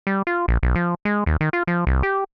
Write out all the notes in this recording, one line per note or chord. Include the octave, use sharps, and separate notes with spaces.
G3
F4
A#1
B1
F3
G#3
D#2
D#3
F4
F3
C2
G4